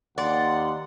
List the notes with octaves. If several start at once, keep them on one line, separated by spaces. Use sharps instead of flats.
D#2 D5 F#5 C6